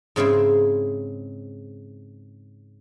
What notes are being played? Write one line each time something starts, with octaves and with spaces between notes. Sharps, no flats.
G#2 C#3 C4 E4